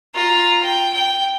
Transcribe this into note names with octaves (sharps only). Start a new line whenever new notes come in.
F4 A#5
G5
G5